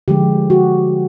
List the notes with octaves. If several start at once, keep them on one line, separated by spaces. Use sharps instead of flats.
D3 F3 G#3 G4
F#4